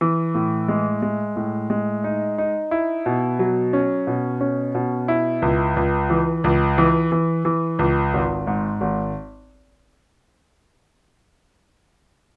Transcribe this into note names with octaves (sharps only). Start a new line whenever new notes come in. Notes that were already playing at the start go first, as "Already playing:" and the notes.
E3
A2
G#3
G#3
A2
G#3
D#4
D#4
E4
B2
F#3
C#4
B2
C#4
B2
E4
C#2
C#2
E3
C#2
E3
E3
E3
C#2
G#1
G#2
G#1